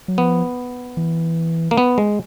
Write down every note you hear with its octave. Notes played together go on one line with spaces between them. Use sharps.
F#3
F3 B3
E3
A#3
B3
G#3